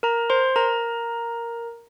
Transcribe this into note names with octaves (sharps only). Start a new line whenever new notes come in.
A#4 A#5
C5 C6
A#4 A#5